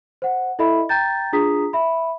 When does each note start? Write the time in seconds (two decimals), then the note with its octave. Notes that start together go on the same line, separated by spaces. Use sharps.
0.22 C5 F#5
0.59 E4 A4 D#5 E5 B5
0.89 G5 A#5 G6 A6
1.33 D4 F4 G#4 A#5 D#6 B6
1.73 E5 B5